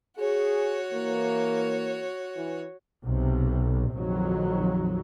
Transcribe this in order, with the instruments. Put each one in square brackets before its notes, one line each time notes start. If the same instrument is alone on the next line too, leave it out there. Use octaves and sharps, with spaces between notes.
[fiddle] F#4 C#5 [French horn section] G#4
[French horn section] E3 A#3
E3
[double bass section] B1 C3
A#1 F2 D#3 F#3